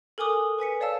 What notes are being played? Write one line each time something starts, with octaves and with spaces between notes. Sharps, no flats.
A4 A#4 G#5 D6 D#6 F#6
B4 G#5 B6 C#7
C#5 D5 F5 A5 E6